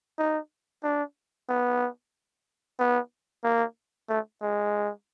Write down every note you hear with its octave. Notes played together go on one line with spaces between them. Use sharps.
D#4
D4
B3
B3
A#3
A3
G#3